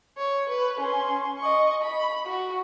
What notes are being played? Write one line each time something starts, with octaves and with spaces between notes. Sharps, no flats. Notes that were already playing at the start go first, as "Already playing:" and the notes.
C#5
B4
C#4 C6
D#5 C#6
B5
F#4